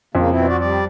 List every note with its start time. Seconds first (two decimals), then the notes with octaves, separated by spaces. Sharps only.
0.15 F2 C#3 A#3
0.30 B2 C4 E4
0.47 F#4 D5
0.60 G3 D5